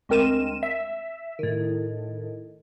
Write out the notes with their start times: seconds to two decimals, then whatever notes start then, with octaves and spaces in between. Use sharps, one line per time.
0.09 D2 G#3 C4 A#4 D#7 E7
0.63 E5
1.39 A2 D#3